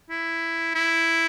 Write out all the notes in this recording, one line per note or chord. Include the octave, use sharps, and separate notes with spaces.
E4
E4